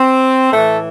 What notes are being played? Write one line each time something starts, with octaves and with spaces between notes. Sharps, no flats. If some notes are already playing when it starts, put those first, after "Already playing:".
Already playing: C4
A2 E3 A3 A4